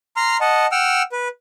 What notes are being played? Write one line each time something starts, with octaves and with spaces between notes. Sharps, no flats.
A#5 C6 F6
D#5 F#5 A5
F#5 G5 E6 F6
B4